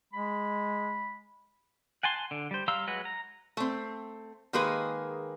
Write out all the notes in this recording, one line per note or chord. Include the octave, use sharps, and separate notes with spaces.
G#3 B5
F#5 G#5 A5 C6
D3
G3 C5
G3 F5 A#5 C6 E6
F#3 G#3 F#4 B4
A#5
A3 C4
D#3 G#3 A#3 G#4 B4